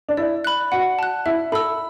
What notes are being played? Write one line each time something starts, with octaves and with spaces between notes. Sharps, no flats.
D4
E4 D5
B5 F#6
F#4 F#5
A5 F#6
E4 E5
A4 B5 E6